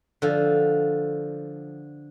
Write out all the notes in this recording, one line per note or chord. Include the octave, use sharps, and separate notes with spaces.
D3 F3